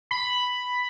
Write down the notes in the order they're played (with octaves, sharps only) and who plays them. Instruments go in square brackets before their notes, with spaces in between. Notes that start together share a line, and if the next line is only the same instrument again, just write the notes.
[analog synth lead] B5